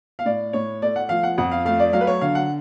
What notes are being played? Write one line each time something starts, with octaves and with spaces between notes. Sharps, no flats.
F5
A2 D5
A2 C#5
A3 D5
F#5
F3 F5
F#5
F2 F#5
F5
A3 F5
D5
F#3 F5
B4
C#5
D3 F5
F#5